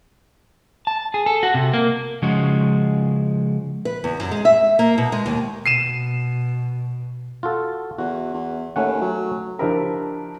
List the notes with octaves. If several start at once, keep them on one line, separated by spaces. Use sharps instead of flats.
A5
G#4
A4
F#4
C3
A#3
C#3 F3 G#3 F#4
B4
E2
F#2
G#3
E5
A#3
B2
G#3
D#2
B2 C7 D#7 E7
F4 F#4 A4
E2 F#4
E2
D#2 A3 C#4 F#5
F#3
F3 D4 E4 G4 A#4 C5